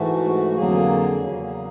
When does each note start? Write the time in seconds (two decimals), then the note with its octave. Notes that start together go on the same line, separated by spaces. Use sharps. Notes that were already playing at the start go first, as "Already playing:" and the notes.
Already playing: G#2 E3 A3 F#4
0.56 F2 D3 F#3 A#3 G#4
1.19 E2 C#3 F#3 A#3